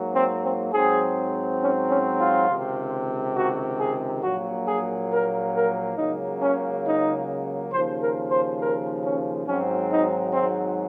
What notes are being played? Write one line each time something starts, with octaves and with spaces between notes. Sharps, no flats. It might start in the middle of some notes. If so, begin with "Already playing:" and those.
Already playing: G#2 F#3 A#3
C4
C4
G#2 F#3 C4 G#4
C#4
C#4
F4
C#2 C3 D#3
F#4
G#4
A#1 A#2 F#3 A#3 F#4
G#4
A#4
A#4
C#2 C#3 F#3 A#3 D#4
C#4
D#4
D#2 C#3 F3 C5
A#4
C5
A#4
C#4
G#1 G#2 F#3 C4 C#4
D#4
C4